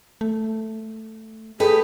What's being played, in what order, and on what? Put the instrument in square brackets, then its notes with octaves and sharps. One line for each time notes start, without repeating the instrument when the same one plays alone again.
[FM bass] A3
[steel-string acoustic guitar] A3 G4 B4 [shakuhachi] G#4